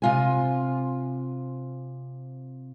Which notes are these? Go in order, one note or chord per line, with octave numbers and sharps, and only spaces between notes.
C3 F4 G#5